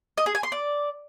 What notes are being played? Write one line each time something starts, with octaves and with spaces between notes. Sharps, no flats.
D#5
G#4
G#5
C6
D5